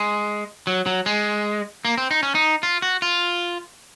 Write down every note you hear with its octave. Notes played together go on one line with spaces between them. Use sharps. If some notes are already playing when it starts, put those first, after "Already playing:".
Already playing: G#3
F#3
F#3
G#3
A#3
C4
D#4
C#4
D#4
F4
F#4
F4